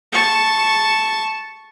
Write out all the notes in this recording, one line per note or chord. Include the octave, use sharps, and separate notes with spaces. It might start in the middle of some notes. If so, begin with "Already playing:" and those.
A5 C#6